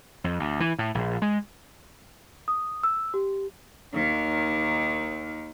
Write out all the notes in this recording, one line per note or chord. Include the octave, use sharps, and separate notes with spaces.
F2
D2
E3
A2
A#1
G#3
D#6
E6
G4
D#2 D#3